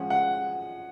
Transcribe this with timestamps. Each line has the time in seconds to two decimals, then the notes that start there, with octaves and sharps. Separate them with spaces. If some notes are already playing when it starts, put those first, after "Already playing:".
Already playing: F3 G#3 C#4 F#5
0.10 F#5